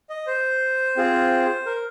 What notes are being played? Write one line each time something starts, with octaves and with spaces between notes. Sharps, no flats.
D#5
C5
C4 F4 G#4
A#4